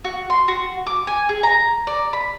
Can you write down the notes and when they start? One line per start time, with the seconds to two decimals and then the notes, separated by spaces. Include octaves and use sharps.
0.04 F#4
0.30 C6
0.48 F#4
0.87 D6
1.07 G#5
1.29 G#4
1.43 A#5
1.87 D5
2.13 B5